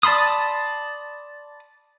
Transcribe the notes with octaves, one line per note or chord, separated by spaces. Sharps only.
D5 A5 B5 C6 D#6